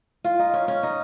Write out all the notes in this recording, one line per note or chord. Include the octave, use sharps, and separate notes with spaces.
F4
D#4
C#4
C#4
D#4